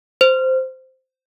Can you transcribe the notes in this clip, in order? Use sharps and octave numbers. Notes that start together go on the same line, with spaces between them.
C5